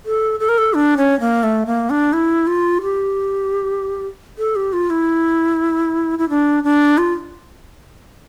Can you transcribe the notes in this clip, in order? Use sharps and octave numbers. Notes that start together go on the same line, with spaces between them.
A4
A4
A#4
A4
D4
C#4
A#3
A3
A#3
D4
E4
F4
G4
A4
G4
F4
E4
E4
D4
D4
F4